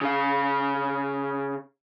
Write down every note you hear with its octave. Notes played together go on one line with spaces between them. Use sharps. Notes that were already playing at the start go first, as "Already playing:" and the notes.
C#3 F5